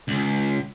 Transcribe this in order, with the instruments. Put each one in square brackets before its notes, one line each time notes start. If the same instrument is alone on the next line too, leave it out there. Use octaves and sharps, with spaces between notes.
[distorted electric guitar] C#2